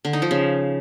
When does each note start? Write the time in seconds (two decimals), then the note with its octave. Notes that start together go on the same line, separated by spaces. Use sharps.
0.05 D3
0.13 D#4
0.22 F3
0.31 C#3